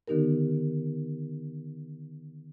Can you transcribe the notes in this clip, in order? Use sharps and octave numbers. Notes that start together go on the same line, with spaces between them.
D3 D#3 B3 D#4 G4 A#4